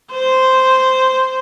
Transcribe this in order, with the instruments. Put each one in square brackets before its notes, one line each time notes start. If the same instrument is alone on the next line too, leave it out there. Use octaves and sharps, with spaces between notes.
[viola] C5